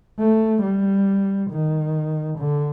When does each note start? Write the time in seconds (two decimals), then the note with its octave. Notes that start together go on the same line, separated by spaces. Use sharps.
0.19 A3
0.63 G3
1.51 D#3
2.39 D3